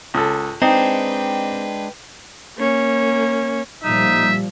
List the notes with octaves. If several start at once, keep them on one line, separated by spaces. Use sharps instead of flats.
C#2 A4
G#3 C4 D4 D#4 B4 G5
A#3 C#4
A#2 F3 G3 D#4 E5